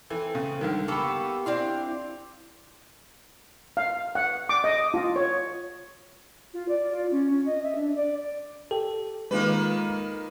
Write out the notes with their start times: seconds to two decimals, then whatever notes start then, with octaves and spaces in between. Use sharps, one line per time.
0.10 E3 C4 A4
0.35 C#3
0.61 C#2 D3 D#3 G3
0.88 A#3 B3 G4 A4 B5 C#6 E6
1.46 C4 D4 E4 F5
3.77 F5
4.15 F#5
4.49 D6
4.64 D#5
4.94 F4
5.16 C#5
6.54 F4
6.68 D5
6.91 F4
7.11 C#4
7.30 C#4
7.46 D#5
7.63 E5
7.75 D4
7.96 D5
8.71 G4 A4
9.31 D#3 G#3 A#3 F4 B4